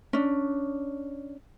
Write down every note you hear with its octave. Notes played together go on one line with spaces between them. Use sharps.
C#4 D4